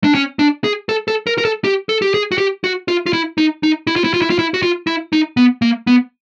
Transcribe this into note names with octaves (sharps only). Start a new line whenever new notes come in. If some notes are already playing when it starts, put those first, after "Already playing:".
D4
C#4
D4
G#4
A4
A4
A#4
A#4
A4
G4
A4
G4
G#4
F#4
G4
F#4
F4
F4
E4
D#4
D#4
E4
F4
E4
F4
E4
F4
E4
F#4
F4
E4
D#4
B3
A#3
B3